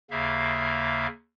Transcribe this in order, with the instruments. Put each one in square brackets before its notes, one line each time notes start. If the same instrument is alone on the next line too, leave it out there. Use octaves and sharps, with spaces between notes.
[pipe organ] D#2 C#3 A#3 E5 F5